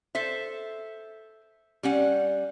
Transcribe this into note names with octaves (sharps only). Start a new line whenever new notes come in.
A4 C5 E5
G3 C#4 F#5